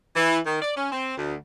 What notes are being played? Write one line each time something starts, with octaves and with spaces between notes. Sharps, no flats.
E3
D#3
D5
C#4
C4
D2